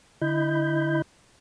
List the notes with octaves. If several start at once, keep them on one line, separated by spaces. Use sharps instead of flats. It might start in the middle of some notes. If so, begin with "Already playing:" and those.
D3 E4 D#5 B5 G6